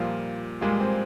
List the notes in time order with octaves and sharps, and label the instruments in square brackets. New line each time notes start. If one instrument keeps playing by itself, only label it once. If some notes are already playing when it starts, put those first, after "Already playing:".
Already playing: [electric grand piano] A#2 G3 A#3 F4 [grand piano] F3
[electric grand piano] A#2 G3 A#3 F4 [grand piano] G#3
[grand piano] C4